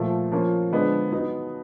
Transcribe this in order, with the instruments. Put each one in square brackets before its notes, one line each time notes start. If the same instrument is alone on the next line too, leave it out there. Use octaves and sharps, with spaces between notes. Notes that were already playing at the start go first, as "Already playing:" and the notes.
Already playing: [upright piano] A#2 F3 A3
F3 A#3 C#4 F4
D3 F3 G#3 B3 D4
F#3 B3 D#4